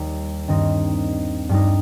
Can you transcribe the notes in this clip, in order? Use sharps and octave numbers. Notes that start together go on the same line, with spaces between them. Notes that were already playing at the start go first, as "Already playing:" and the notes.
Already playing: D#2 G3 D#4
G2 D#3 C4 D#4
G2 G3 D#4